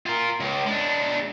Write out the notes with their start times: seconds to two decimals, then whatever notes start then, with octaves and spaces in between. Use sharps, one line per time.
0.06 F4 A#4
0.40 C#2
0.67 G#3 D4